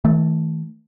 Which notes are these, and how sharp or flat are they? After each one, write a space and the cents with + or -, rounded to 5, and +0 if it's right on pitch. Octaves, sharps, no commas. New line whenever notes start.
E3 -45 A3 +0